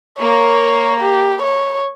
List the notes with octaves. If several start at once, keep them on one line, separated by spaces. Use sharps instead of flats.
A#3 C#5
G4
C#5